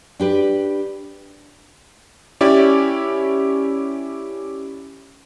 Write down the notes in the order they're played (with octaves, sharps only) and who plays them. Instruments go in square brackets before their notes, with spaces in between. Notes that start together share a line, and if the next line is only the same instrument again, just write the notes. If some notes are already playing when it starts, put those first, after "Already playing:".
[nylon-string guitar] D4 G4 B4
[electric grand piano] C#4 E4 G4 D5